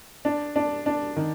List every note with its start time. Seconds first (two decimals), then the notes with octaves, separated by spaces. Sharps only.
0.25 D4
0.56 D4
0.86 D4
1.16 D#3